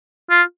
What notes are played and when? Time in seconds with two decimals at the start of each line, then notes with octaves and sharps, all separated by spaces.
0.30 F4